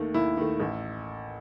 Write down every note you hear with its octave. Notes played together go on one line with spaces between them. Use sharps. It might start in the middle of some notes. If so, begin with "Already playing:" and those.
Already playing: D#2 D#3 A3
D#2 E4
D#3 A3
A1